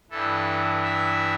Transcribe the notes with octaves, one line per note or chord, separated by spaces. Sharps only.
G2 E3 A4
E5